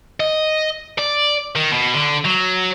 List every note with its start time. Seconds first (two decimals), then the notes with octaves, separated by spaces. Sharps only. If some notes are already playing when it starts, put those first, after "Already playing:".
0.20 D#5
0.98 D5
1.56 D#3
1.72 B2
1.95 D3
2.25 F#3